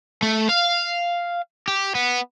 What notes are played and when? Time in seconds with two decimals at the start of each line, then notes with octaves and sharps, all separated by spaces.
0.23 A3
0.49 F5
1.68 G4
1.95 B3